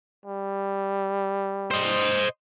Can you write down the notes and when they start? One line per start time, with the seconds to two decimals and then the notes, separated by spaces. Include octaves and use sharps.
0.25 G3
1.71 C5 D#5